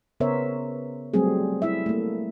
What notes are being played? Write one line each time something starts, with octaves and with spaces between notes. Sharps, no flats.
C#3 B3 A#4 C5 C#5 E5
F#3 G3 A3 C4 G#4
E4 E5
A3 A#3